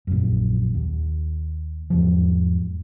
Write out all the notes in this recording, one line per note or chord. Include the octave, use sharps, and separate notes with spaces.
A#1 F#2
D#2
E2 G#2 F3